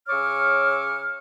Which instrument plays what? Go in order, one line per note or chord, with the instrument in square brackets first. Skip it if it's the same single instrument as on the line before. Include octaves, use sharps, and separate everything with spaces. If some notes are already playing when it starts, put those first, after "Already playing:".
[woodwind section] C#3 C#5 C#6 D6 E6 F6